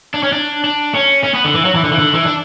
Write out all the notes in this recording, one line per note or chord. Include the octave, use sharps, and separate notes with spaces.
D4
C#4
D4
D4
C#4
C#4
B3
D3
E3
F#3
E3
D3
E3
D3
E3
D4